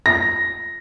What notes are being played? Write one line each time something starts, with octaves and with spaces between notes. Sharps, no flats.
A#6